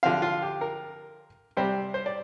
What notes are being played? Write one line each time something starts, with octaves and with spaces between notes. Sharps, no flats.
D3 F3 C4 F5
F4
G4
A#4
C3 G3 C4 C5
C5
D5